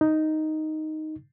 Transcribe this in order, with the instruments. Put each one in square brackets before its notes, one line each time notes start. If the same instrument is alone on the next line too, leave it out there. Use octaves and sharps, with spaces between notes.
[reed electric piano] D#4